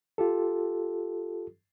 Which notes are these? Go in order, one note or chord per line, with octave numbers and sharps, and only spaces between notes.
F4 G4 A4